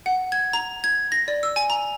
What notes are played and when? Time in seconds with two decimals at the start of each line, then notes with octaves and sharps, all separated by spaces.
0.06 F#5
0.32 G#6
0.53 A#5
0.84 G#6
1.12 A#6
1.28 D5
1.43 E6
1.56 G#5
1.70 A#5